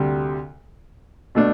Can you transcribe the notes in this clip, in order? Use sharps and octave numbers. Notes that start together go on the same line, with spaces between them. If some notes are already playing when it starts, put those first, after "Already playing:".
Already playing: D2 C3 G3
B2 A3 D4